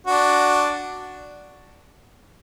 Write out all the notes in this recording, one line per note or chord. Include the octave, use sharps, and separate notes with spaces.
D4 F#4